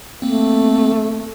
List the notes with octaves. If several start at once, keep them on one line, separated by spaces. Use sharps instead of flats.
A3 A#3 C4